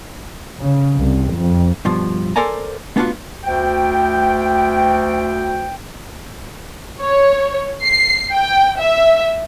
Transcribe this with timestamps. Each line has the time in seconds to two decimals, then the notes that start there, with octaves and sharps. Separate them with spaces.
0.62 C#3
0.99 C2
1.34 F2
1.85 G2 B2 F3
2.36 A4 A#4 C5 D5 G#5 A#5
2.96 A3 B3 D4 D#4 F4 F#4
3.44 D2 G5
7.01 C#5
7.82 C7
8.32 G5
8.80 E5